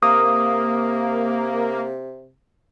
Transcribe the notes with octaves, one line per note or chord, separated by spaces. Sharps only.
C3 A#3 D#6